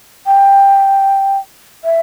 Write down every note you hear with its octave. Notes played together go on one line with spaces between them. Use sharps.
G5
E5